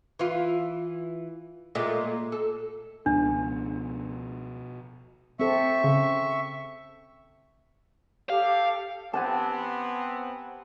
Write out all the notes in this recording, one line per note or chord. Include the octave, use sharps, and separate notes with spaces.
E3 F4
A#2 G#3 A3
A4
C#2 B2 F3 B3 D4
C4 A4 E5 C#6
C#3
G4 A4 F5
B3 C4 G4 F#5 G#5 A5